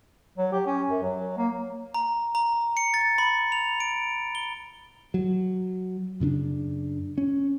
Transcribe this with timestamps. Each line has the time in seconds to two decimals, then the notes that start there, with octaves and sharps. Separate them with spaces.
0.38 F#3
0.52 G4
0.66 C#4
0.90 F#2
1.02 F#3
1.38 A#3
1.94 A#5
2.35 A#5
2.77 C#7
2.94 A6
3.18 B5
3.52 F7
3.80 D7
4.35 G7
5.14 F#3
6.20 F#2 C#3 C#4 D4
7.18 C#4